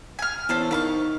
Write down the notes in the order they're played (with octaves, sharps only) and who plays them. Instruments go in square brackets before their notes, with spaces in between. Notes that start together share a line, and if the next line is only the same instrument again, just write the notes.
[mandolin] G#5 F6
[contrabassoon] E2 [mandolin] C#4 A4 C5
[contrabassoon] D#3 [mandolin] F5 B5 C#6